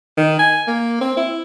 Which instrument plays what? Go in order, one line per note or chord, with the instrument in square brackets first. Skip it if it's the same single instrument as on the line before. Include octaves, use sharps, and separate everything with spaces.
[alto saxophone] D#3
G#5
A#3
C4
E4